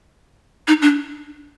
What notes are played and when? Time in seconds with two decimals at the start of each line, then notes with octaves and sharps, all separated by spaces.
0.68 D#4
0.82 D4